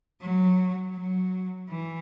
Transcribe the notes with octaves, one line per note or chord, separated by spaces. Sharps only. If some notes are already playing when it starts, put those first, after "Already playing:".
F#3
F#3
E3